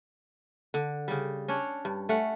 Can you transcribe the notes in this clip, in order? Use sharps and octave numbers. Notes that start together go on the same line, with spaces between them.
D3
C#3 G3
C#4 D4 C#5
G2
A3 C#4 F#5